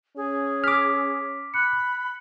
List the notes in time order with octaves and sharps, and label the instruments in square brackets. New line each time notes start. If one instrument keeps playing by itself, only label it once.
[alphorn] C#4 [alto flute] G#4
[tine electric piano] D6 F6 [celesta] B6
[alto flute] B5 [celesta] F#6 C#7